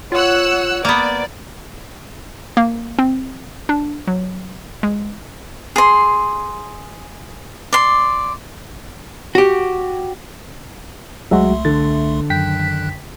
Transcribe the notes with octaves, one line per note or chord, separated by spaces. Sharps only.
F4 C#5 F#5 E6 F#6
A#3 B3 D5
A#3
C4
D4
F#3
G#3
G#4 C6
D5 C6
F#4 G4
C2 F#3 G#3 A3 F#4 E5 C6
D3 A6
F#2 D#3 G5 F#6 B6